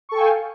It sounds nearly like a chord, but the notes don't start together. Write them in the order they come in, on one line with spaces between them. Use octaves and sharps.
C#6 A4 G5 G#5 F5